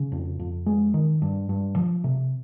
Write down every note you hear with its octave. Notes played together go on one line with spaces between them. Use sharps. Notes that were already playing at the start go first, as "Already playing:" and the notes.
Already playing: C#3
F2
F2
G#3
D#3
G2
G2
F3
C3